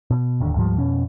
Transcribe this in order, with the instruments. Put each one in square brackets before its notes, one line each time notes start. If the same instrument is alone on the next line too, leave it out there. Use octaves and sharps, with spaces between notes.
[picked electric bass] B2
D1 D#2 D3
D2 G#2 F3 G3
F2 B2 C#4